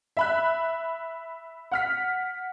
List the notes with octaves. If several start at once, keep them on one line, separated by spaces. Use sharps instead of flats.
E5 B5 F#6
F#5 F6 B6